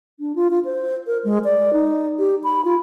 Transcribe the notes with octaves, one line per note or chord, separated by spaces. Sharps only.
D4
F4
F4
C5
A#4
G#3
D5
D#4
G4
B5
F4